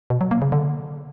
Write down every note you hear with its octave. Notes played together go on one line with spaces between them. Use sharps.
B2
F#3
A#3
C#3
D3